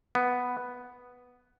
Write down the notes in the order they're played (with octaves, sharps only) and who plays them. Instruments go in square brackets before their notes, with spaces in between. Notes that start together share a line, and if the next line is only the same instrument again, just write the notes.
[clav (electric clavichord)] B3